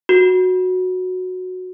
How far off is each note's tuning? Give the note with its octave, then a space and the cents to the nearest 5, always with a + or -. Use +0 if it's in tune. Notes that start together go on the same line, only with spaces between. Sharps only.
F#4 -10